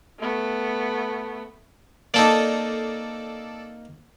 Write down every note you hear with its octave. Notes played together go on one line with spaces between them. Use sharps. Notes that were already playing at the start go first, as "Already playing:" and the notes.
A3 B3
A#3 C4 D#4 A4 D5